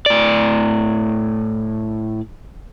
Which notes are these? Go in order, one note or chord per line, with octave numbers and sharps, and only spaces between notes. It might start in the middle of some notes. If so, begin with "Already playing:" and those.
A2 D5